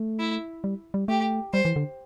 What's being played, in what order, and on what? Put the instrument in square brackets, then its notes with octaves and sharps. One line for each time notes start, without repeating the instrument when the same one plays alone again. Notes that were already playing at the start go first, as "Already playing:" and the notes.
Already playing: [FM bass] A3
[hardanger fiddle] E4
[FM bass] G3
G3
[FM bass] A3 [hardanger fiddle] G4
[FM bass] G3 [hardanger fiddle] C5
[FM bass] E3
D3